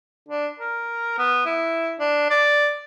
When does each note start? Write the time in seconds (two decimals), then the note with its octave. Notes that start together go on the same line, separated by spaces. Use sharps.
0.29 D4
0.60 A#4
1.18 B3
1.46 E4
1.99 D4
2.30 D5